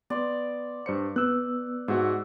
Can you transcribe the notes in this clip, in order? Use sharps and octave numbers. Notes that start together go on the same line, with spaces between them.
B3 D5 C6
G2 C5 C#7
B3 E6 F#6
G#2 F#4 E5 F#5